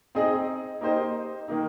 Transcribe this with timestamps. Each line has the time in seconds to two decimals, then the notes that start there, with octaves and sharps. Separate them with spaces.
0.15 C4 D#4 G#4 D#5
0.81 A#3 D#4 G4 C5 D#5
1.48 D#3 A#3 D#4